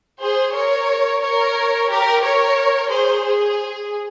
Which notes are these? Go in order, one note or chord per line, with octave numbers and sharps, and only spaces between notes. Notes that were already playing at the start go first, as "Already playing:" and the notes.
G#4 C5
A#4 C#5
A#4 C#5
G4 A#4
A#4 C#5
G#4 C5
G#4